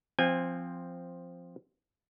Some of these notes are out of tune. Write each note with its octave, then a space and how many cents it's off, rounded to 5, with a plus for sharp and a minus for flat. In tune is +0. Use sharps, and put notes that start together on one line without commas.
F3 +0 C4 +0 G#5 -25